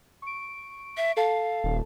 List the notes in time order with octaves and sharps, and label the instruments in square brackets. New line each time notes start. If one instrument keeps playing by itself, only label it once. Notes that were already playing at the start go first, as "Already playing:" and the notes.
[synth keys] C#6 D7
[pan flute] E5
[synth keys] A4 A5 [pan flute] F5
[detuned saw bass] D#1